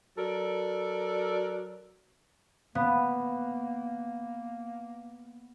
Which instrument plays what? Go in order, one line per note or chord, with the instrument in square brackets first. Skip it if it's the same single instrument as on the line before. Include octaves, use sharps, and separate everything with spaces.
[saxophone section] F#3 A4 A#4 D5
[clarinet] A#3 [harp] B3 [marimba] F5 B5